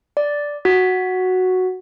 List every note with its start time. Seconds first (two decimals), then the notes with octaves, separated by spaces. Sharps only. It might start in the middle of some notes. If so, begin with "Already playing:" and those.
0.17 D5
0.65 F#4